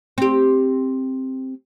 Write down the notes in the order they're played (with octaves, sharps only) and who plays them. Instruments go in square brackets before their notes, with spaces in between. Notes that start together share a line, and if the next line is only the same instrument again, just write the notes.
[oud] C4 G4